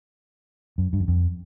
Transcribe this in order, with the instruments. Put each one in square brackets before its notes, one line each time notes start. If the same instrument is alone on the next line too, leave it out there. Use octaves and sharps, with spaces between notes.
[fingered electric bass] F#2
G2
F#2
F2